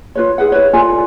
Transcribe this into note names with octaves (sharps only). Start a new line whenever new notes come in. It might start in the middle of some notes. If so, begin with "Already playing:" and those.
F4 B4 C#5
E4 G#4 B4 F#5
E4 B4 C#5
F4 A4 D5 G#5